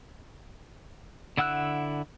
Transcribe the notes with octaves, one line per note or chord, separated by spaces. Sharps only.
D3 E4 F#5 E6 F#6